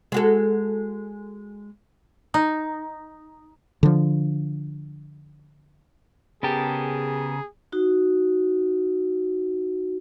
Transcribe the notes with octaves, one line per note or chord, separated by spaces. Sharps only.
G#3 F#4 A4
D#4
D3 F3
C#3 B3 G4 G#4 A#4 A5
D#4 F#4